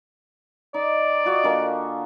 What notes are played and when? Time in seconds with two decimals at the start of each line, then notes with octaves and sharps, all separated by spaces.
0.74 D#4 D5
1.25 F4 F#4 D#5
1.43 D3 A#3 G#5